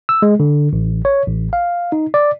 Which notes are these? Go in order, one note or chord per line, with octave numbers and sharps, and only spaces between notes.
E6
G#3
D3
A1
C#5
A1
F5
D#4
D5